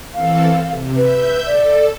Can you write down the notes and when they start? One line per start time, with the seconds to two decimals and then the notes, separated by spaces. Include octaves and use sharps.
0.14 E3 C4 A4 F5
0.66 C3
0.96 B4 E5 G6
1.46 A4 D5